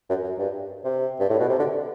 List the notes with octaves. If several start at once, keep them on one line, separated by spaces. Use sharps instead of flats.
F#2
F#2
G2
C3
G2
A2
B2
C3
D3